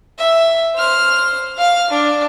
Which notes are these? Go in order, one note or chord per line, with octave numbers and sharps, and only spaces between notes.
E5
C5 F6
F5 F6
D4